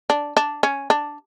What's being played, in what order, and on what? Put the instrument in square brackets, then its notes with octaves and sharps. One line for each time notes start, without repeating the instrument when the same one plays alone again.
[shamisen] D4
D4
C#4
D4